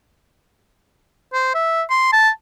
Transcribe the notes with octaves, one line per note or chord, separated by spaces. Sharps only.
C5
E5
C6
A5